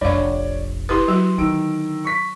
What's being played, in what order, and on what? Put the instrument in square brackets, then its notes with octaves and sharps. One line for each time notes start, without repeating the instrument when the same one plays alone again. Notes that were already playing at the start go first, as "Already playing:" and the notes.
[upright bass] F1 A#1 [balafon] D4 F5 [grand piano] C#5 D5
[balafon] E4 G4 B4 [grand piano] C6 D#6
[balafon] F#3 F#4
[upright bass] D3 [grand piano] D#3 E6 D7
[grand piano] C#6 B6